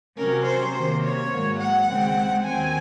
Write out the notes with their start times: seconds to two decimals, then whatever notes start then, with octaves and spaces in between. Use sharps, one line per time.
0.18 C3 F#3 C#4 A#4
0.46 C5
0.74 C3 D#3 A#3
1.03 C#5
1.31 G#2 F#3 A#3
1.59 F#5
1.88 D#2 C#3 G#3 C4
2.44 D#2 D#3 F#3 C4 G#5